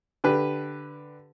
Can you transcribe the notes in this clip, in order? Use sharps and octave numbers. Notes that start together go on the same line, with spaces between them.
D3 G4 B4